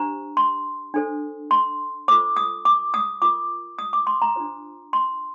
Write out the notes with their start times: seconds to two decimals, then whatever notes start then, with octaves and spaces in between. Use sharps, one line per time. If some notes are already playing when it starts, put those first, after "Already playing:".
Already playing: D4 G4 C5 A#5
0.37 C6
0.94 D4 A4 C5
1.51 C6
2.08 F4 A4 C5 D6
2.37 D#6
2.65 D6
2.94 D#6
3.22 F4 A#4 D6
3.79 D#6
3.93 D6
4.07 C6
4.22 A#5
4.36 D4 F4 C5
4.93 C6